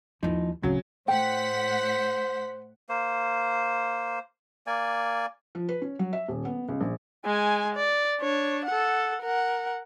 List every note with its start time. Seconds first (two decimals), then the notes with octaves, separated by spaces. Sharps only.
0.23 D#2 F3 D#4 E4
0.63 D1 C#3 F#3 C4
1.08 A2 C5 F#5 G5 B6
2.89 A#3 C5
4.67 A#3 D5 G#5
5.55 F3
5.69 B4
5.82 C#4
5.99 F#3
6.13 E5
6.28 D#1
6.45 B3
6.69 C#2
6.80 A#1
7.25 G#3 G#5
7.75 D5
8.21 D4 C#5
8.66 A4 F#5
9.22 A#4 F#5